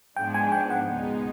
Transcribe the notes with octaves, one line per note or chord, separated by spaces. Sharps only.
G#2 F3 G#3 B3 D4 G5
G#5
G5
F#5
C#2 B2 G#3 B3 D#4